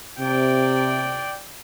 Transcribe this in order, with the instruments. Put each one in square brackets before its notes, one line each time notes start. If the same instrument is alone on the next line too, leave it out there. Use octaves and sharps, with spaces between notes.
[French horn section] C3 [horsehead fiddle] D5 G5